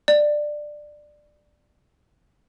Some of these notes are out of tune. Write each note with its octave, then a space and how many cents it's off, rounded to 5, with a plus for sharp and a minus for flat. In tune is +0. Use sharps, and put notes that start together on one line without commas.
D5 +15